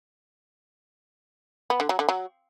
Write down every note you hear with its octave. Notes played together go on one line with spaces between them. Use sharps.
B3
D3
F#3
D3
F#3